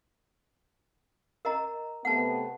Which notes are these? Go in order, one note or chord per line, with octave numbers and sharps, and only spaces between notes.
A#4 D#5 A#5
C3 A3 B3 F#5 A5